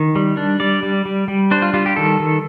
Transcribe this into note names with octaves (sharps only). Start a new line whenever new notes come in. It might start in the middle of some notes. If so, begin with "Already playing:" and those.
Already playing: D#3
G3
D4
G3 D5
G3
G3
G3
D4 C5
F4
G3 F4
G4
D#3 A4
D#3